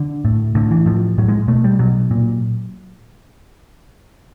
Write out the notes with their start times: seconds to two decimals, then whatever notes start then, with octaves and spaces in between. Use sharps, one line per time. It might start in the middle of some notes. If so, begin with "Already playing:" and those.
Already playing: D3
0.25 A2
0.55 A2 D3
0.71 E3
0.86 A2 F3
1.18 A2 F#3
1.28 G#3
1.48 B2 A3
1.64 G3
1.79 B2 F#3
2.11 A#2